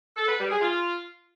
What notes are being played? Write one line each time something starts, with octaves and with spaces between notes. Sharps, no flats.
A4
B4
G3
G#4
F4